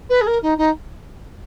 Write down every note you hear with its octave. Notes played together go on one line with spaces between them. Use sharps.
B4
G#4
A#4
D#4
D#4